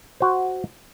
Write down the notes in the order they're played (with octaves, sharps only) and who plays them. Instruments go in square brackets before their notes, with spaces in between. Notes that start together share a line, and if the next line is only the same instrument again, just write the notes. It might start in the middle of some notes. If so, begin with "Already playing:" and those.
[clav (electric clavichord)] F#4 C5